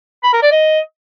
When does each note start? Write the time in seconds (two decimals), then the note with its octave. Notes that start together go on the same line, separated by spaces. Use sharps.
0.24 B5
0.33 A#4
0.42 D5
0.52 D#5